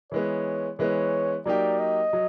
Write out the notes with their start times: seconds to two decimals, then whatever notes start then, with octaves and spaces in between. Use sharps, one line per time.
0.12 E3 G#3 B3 C#5
0.79 E3 G#3 B3 C#5
1.46 F#3 A#3 D#4 G4 D5
1.79 D#5
2.13 F#3